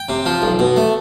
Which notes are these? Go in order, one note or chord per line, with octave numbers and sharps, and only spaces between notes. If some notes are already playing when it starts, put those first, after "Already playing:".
Already playing: G5
C3
F3
B1
B2
A3